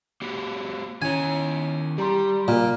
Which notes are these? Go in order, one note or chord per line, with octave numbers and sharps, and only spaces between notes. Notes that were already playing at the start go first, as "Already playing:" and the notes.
A#3 F#4 G4
D#3 C#4 E4 C#5 G#5
G3 G4 A#5 C6
A#2 D5 A#5 F6